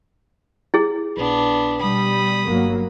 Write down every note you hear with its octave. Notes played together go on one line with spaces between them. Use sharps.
E4 G#4
A#1 B3 D4
B2 G3 B5 D#6
G1 F#3 A#3